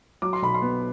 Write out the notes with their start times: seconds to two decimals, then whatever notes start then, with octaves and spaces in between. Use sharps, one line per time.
0.22 F#3 D6
0.33 C6
0.42 B1 B5
0.54 C6
0.62 B3